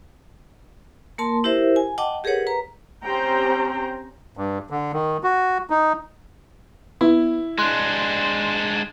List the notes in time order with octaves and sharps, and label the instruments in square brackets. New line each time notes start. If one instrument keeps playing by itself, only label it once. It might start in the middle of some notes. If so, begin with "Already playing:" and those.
[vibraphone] A#3 A#4 A5 C6
E4 G4 A#4 C5 E5
G#5
D#5 F#5 G5 A5 D6
G4 G#4 A#4 B4 C#5 F#5
B4 A#5
[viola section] C4 C#4 G4 C5 G5 A#5
[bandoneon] G2
D3
D#3
F#4
D#4
[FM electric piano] B3 [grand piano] E4
[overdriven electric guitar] G#3 D4 [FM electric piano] C6 F#6